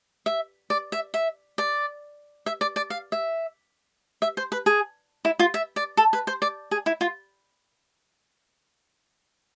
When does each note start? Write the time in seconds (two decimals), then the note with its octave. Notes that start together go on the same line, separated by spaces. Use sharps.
0.26 E5
0.70 D5
0.92 E5
1.14 E5
1.58 D5
2.46 E5
2.61 D5
2.76 D5
2.90 F5
3.12 E5
4.22 E5
4.37 C5
4.52 B4
4.66 G#4
5.25 E4
5.39 F4
5.54 E5
5.76 D5
5.97 A4
6.13 B4
6.27 C5
6.42 D5
6.71 G#4
6.86 E4
7.01 F4